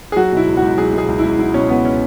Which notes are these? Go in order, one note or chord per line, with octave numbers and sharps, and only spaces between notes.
G#4
F#3 F#4
B2 E4
C#2
F#4
C#2
F#3 G#4
B2
G#4
C#2
C#2 E4
F#3 E4
B2 C#4
C#2 B3
C#4